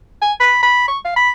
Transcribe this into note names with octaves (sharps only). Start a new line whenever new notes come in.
G#5
B5
B5
C#6
F5
B5